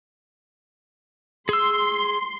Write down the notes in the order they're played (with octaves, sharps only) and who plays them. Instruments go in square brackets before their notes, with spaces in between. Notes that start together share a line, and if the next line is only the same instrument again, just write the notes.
[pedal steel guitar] G#4 E6 [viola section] C6